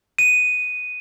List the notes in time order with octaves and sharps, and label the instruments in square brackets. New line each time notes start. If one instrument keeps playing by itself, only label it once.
[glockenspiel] D#7